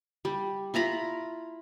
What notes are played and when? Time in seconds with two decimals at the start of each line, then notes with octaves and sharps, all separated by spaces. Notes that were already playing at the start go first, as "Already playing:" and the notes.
0.25 G3
0.74 E4 F4 A#5 B5